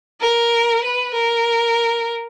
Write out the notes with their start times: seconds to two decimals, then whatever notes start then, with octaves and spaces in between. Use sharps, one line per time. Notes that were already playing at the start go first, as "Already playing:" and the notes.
0.20 A#4
0.83 B4
1.13 A#4